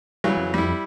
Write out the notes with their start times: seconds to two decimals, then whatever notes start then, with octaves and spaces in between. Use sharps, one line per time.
0.24 C#3 E3 F#3 G3
0.37 F2
0.54 G3 E4